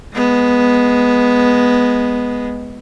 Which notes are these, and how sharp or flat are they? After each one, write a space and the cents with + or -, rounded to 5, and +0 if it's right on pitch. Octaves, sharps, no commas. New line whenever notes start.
G#3 +0 B3 -5